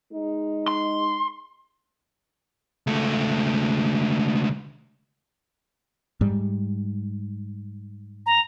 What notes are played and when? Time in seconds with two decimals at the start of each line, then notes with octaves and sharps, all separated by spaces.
0.13 G#3 D#4
0.68 C6
2.87 C#2 A3
6.21 G#2 G3
8.26 A#5